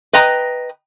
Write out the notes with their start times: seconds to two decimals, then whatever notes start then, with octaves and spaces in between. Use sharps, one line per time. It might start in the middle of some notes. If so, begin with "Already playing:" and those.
0.13 B4 D#5 G5 A#5